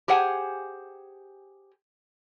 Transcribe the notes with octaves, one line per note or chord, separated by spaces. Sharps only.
G4 G#4 C5 F#5 G#5